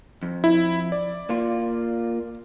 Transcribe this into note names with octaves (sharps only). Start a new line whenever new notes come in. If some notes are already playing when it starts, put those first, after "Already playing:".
F2
E4
D5
A#3 F4